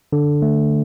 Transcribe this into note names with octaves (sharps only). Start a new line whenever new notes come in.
D3
A3